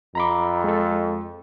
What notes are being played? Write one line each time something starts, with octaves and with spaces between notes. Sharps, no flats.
F2 A#5 B5 D6
G#3 A4